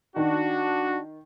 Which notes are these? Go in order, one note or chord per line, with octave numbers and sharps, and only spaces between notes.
D#3 D4 F#4